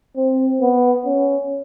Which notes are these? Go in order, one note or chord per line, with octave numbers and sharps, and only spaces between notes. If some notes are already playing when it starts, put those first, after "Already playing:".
C4
B3
C#4